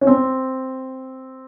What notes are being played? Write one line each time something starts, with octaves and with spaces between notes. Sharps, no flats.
C#4
C4